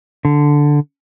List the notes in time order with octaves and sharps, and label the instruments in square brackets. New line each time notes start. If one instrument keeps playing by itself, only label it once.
[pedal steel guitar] D3